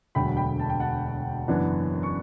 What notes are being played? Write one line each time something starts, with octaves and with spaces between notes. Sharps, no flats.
E1 D2 D3 F#3 G5 B5
G5 B5
A5
G5
F#5 A5
F#1 F#2 E3 B3 D4
C#6